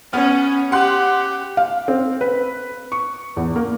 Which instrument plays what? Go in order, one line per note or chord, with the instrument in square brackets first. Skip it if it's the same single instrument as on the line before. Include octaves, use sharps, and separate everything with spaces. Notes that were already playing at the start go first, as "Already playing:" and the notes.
[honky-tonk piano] B3 F6 [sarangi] C#4
[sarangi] G4 [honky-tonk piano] F#5 C6 F#6
[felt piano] F5
C4
B4
C#6
E2
A#3